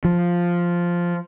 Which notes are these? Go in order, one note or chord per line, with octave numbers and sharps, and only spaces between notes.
F3